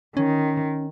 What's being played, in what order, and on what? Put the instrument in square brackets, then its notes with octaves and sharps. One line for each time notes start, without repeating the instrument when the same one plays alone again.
[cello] D#3 [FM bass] C#4